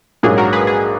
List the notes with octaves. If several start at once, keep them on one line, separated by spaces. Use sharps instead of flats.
A#1 G#2 F#3 A#3 G#4
F#4 A#4
G#4 B4
G#4